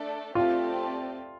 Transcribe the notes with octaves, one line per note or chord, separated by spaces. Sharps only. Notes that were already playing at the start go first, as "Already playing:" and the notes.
Already playing: A3 D4 A4 D5
A3 C4 F4 G4 D5 A5